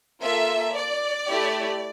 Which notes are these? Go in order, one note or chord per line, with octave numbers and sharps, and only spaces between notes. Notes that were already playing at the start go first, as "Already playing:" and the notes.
A#3 F4 A4 E5
D5
A3 E4 G4